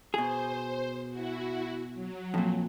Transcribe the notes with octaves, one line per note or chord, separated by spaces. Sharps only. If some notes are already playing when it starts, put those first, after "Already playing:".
B2 G#4 C5
E4 F#4
F#3
F2 A#2